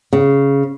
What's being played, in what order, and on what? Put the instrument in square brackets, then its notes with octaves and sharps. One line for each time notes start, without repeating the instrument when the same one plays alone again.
[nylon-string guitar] C#3